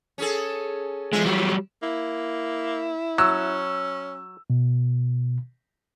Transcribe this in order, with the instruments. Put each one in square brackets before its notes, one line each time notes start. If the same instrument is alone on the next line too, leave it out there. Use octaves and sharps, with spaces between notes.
[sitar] C#4 G#4 A4
[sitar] E2 F4 E5 [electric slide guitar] G#3
[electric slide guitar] F#3 G3
[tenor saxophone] A#3 [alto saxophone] E4
[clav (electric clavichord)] F#3 [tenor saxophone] C#4 [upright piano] E6
[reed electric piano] B2